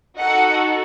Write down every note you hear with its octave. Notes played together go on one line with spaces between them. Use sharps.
D#4 F#4 A4 D#5 F#5